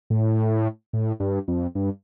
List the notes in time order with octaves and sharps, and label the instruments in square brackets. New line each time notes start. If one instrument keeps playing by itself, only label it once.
[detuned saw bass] A2
A2
G2
F2
G2